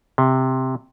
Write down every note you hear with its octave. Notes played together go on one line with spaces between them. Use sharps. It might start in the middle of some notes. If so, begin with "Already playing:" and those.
C3